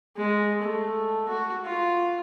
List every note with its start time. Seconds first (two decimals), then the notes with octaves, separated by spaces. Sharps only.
0.17 G#3
0.62 A3
1.29 F#4
1.65 F4